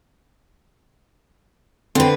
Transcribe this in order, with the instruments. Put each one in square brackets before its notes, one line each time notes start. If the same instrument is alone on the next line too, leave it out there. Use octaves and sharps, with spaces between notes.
[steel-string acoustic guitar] D3 B4 [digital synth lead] C4